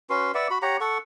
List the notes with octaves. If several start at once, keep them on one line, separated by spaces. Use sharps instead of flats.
C#4 F#4 B4 C6
B4 D5 E5 F#5
F#4 B5
G4 C#5 F#5 A#5
A4 F#5 C#6